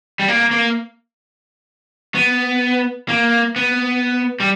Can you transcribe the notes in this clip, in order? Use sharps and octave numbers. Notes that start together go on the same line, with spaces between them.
G3
A#3
A#3
B3
A#3
B3
G3